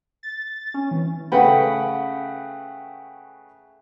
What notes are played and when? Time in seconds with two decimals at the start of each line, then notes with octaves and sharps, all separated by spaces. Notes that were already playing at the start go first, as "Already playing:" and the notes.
0.23 A6
0.74 C#4
0.91 E3
1.32 C#3 A3 B4 F#5 G5 B5